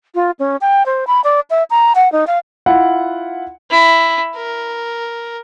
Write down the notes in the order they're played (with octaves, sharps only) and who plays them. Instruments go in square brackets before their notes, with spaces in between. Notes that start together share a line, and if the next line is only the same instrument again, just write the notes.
[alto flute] F4
C#4
G5
C5
B5
D5
E5
A#5
F#5
D#4
F5
[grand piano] E4 F4 F#5
[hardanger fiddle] E4
A#4